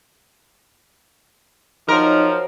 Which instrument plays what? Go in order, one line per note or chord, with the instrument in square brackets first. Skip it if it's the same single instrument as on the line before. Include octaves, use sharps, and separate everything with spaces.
[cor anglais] F3 [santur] F#3 C5 G5 [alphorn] D#4 [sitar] A#4